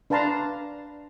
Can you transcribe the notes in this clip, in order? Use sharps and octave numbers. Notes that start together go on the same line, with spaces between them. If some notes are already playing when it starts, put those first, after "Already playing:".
D4 B4 F5 A5 A#5 C6